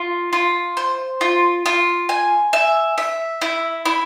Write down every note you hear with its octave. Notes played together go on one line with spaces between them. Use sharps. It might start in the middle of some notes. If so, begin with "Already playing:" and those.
Already playing: F4
F4
C5
F4
F4
G#5
E5
E5
E4
E4